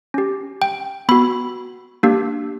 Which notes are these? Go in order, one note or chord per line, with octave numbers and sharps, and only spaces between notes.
C#4 G4
G5
B3 F#4 B5
A#3 D4 G4